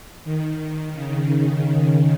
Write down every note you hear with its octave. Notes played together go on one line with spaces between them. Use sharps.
D#3
C#3